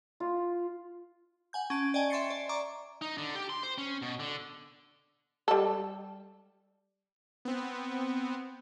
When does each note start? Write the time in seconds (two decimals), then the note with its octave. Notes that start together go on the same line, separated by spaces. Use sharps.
0.20 F4
1.53 F#5 G#5 G6
1.70 C#4 A5 D7
1.94 D5 D#5 G5 G#5
2.10 E5 C6 C#6 A6 C7 C#7
2.30 D5
2.49 D5 A#5 C#6 D6
3.02 D#4
3.18 D3
3.35 G4
3.50 C6
3.63 C5
3.78 C#4
4.02 B2
4.20 D3
5.48 G3 A4
7.45 B3 C4